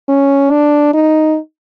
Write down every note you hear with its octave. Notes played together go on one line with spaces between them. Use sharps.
C#4
D4
D#4